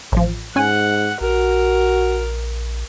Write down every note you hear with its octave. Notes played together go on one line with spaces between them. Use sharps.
A1 F3
G#2 C#4 F#5 G#5
A#1 F#4 A#4